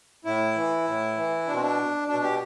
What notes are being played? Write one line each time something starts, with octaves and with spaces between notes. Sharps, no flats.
A2 E4
E3
A2
E3
B2 D4
C4
D4
B2 D4
G4